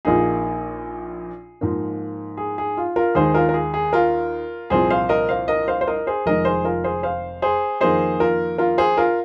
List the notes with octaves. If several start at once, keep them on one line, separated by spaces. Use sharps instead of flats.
A#1 A#2 A#3 D#4 G#4
G#2 F3 A#3 D#4
G#4
G#4
F4
F4 A#4
D#2 D#3 G#3 D#4 G#4 C5
F4 A#4
A#4
G#4
G#4
F4 A#4
C2 A#2 F3 C4 G#4 C5
C5 F5
A#4 D#5
C5 F5
A#4 D#5
C5 F5
C5
A#4 D#5
G#4 C5
F1 F2 D#3 G#3 D#4 A#4 D#5
G#4 C5
F4 A#4
G#4 C5
C5 F5
G#4 C5
F2 D#3 A#3 D#4 G#4 C5
F4 A#4
F4 A#4
G#4 C5
F4 A#4